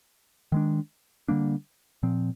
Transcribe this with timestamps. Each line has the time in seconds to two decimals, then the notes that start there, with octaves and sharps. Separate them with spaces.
0.52 D#3 G#3 D4
1.28 D3 G3 A#3 D4
2.03 A#2 F3 C4